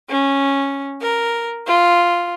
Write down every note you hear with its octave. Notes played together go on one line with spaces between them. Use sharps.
C#4
A#4
F4